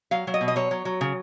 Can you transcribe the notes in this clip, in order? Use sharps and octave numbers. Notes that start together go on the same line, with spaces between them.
F#3 F5
F#3
D#5
B2
D#5
F#3 C#5
F#3
F#3
C#3